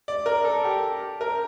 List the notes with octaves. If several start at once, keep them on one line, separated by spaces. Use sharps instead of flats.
D5
A#4
A4
G4
A#4